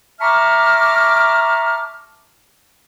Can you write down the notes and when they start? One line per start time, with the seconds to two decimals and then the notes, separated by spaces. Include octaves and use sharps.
0.21 E5 A5 A#5 C#6 D6 F6